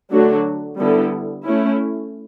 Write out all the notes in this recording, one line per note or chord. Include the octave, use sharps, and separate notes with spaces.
D3 F#3 A3 D4 F#4
D3 G3 B3 E4 A4
A3 C#4 E4